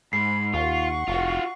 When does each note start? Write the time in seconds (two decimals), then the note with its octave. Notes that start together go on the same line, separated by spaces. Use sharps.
0.13 G#2 B5 C7
0.54 D#2 F4 F#5 C#6
1.08 F1 F4 F#4